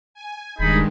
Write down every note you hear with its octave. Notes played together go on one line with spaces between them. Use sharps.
G#5
D#1 G2 D#3 G#3 D#4 G#4 B5